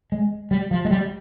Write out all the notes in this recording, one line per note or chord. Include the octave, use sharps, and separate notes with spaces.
G#3
G3
F3
G#3
G3